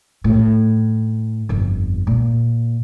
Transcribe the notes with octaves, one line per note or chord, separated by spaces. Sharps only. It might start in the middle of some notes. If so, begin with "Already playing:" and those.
A2
G1 F2
A#2